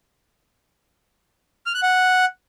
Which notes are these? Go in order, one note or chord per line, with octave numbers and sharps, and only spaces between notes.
F6
F#6
F#5